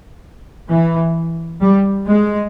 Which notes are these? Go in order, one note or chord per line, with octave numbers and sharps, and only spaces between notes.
E3
G3
G#3